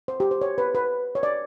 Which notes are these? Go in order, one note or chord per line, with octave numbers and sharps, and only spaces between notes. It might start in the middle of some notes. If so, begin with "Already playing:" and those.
C5
G4
C5
C#5
B4
B4
C#5
D5